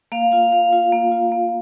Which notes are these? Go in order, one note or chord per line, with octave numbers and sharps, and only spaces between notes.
A#3 F5
F4 F5
A#3 F5
F4
A#3
F4
A#3